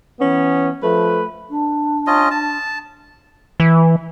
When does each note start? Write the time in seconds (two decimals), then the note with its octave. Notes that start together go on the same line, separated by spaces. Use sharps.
0.20 E3 B3 C#4
0.82 F3 A3 B4
1.49 D4
2.07 C#4 F4 D#5
2.31 A5
3.60 E3